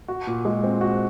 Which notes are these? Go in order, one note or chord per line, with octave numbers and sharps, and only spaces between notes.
F#4
A#2
G#3
C4
F#4